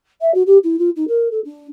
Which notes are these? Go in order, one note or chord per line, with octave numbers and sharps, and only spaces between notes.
E5
F#4
G4
E4
F4
D#4
A#4
A4
D4